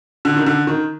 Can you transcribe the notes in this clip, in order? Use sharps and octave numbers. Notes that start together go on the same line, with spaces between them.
D3
D#3
D3
D#3